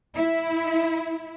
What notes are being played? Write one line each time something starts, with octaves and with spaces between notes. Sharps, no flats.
E4